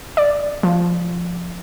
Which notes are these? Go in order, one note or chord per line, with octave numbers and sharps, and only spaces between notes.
D5
F3